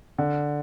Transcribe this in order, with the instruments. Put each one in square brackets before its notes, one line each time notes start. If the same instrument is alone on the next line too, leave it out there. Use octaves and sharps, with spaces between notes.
[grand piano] D3